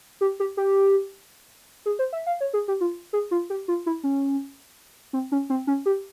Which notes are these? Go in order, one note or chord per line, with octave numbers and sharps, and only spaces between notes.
G4
G4
G4
G#4
C5
E5
F5
C#5
G#4
G4
F4
G#4
F4
G4
F4
E4
C#4
C4
C#4
C4
C#4
G4